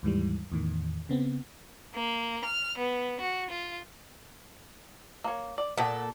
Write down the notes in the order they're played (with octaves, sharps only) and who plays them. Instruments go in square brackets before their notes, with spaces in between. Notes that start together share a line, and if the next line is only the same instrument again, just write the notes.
[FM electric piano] D#2 G#2 E3 G3
E2 A2 D#3
C#3 B3 C4
[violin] A#3
F6
B3
F#4
F4
[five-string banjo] A#3 C#5
D5
[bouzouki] A#2 A4 [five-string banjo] B3 G5 B5